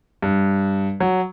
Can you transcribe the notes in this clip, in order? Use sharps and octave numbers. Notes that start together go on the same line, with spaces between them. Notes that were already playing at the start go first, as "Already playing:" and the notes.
G2
F#3